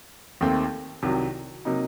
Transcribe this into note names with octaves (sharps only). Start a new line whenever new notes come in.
D#2 D#3 A3 C4
C2 C3 D#3 F#3
C3 F#3 A#3 D#4